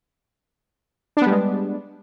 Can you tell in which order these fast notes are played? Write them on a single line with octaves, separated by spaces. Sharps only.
D4 B3 G3 G#3